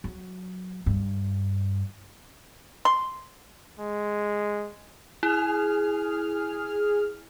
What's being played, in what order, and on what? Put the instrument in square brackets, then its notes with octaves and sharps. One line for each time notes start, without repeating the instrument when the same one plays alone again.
[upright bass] F#3
G2
[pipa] C6
[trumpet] G#3
[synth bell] E4 [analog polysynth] G#4 F6